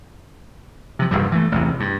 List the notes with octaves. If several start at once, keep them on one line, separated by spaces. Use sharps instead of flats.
C3 F3
D#1 E2 G2 G3
E3 A3
A1 E2 C3
G2